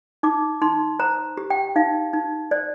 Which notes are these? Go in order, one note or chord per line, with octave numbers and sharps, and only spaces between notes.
D#4 D6
D#4 C6
C5 A#5
G4
G5
D#4 F5
D#4
C5 D5